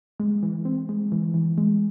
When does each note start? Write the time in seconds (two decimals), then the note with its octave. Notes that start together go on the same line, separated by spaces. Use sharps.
0.20 G#3
0.43 E3
0.65 C4
0.89 G#3
1.12 E3
1.34 E3
1.58 G#3